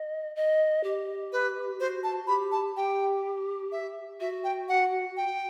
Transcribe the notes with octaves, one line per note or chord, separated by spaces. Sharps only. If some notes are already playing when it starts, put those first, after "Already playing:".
Already playing: D#5
D#5
G4
B4
F#4 C5
A5
G4 B5
A5
G4 G5
E5
F#4 E5
G5
F#5
G5